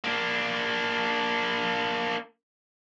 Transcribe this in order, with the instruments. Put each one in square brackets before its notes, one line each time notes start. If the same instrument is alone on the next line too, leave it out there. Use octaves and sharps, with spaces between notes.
[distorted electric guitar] A#3 D4